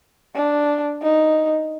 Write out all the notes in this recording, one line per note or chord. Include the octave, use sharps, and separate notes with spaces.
D4
D#4